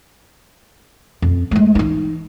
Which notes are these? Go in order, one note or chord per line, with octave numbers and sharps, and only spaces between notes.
F2
G#3 A3
E3 D#4